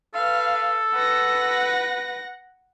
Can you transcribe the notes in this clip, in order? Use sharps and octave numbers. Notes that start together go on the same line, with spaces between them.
A4 B4 F5
B4 F#5 A#6